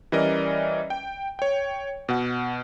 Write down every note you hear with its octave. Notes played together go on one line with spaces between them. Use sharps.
E3 G3 C#4 A#4 D5 D#5
G5
C#5 G5
B2 F#5